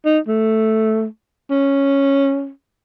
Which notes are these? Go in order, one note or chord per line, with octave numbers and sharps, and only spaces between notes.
D#4
A3
C#4